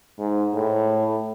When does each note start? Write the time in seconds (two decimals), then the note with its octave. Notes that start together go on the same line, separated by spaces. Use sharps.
0.19 G#2
0.54 A2